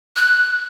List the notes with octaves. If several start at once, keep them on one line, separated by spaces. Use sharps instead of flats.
F#6